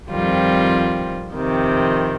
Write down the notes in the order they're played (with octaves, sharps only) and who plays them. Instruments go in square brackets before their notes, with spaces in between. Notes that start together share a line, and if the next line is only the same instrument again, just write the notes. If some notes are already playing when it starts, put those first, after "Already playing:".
[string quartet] F2 D#3 G3 C4 F4
F2 C3 D#3